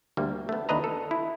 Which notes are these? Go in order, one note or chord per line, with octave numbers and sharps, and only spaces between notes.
D2 G3 A#3
A3 B3
D#2 D4 B4 D#5 A#5
A4
E4